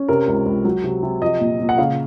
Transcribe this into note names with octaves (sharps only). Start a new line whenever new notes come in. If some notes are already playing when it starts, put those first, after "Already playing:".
Already playing: C#4
C3 A#4
C#2
C#2
F#3
C3
C3
F3 D#5
A#2
A#2
F#5
C#3 F5